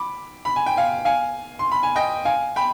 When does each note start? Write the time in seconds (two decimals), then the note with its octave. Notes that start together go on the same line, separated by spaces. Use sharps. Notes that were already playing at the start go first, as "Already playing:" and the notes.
Already playing: B5 D6
0.45 B5
0.56 G#5
0.66 G5
0.77 F5 G#5
1.05 F5 G#5
1.59 C6
1.72 B5
1.83 G#5
1.96 D#5 G5
2.25 F5 G#5
2.56 G5 B5